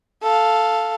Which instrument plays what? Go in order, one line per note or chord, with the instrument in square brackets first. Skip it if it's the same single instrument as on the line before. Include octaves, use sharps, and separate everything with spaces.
[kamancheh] A4 F5